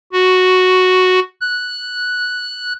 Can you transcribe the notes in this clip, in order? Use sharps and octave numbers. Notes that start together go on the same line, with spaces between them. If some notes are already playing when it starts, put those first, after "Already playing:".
F#4
F#6